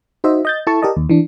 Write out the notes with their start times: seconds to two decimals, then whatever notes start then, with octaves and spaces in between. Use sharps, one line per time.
0.24 D#4 F#4 C5 D#5 E5
0.45 D#5 G6 A6
0.67 E4 A4 A5 C#6
0.82 G4 A#4 D5 D#5 A5
0.96 D#2
1.10 E3 D4